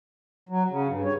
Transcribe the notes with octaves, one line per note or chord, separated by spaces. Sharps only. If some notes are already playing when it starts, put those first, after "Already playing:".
F#3
C#3
G2
C#5